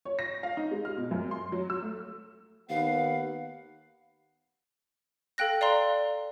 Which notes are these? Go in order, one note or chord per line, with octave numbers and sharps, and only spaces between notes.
C#5
A#6
F5
D#4
G#3
F6
B2
F#2
C6
F#3
E6
A3
D#2 B3 B4 F5 F#5
A4 F5 G5 F#6 A#6
D5 F5 A#5 C6